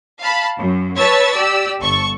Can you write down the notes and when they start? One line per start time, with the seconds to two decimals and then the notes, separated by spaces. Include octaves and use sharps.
0.21 F5 A5 B5
0.57 F#2
0.97 B4 C#5 A5 C#6 E6 A6
1.33 G4 D5 E6
1.81 G1 A4 C#6